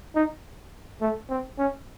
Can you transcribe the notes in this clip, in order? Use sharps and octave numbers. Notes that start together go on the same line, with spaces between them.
D#4
A3
C4
C#4